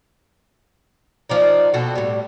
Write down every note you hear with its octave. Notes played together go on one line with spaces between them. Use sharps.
F3 D4 D#4
B2 C4 F#4 A4
A2 G3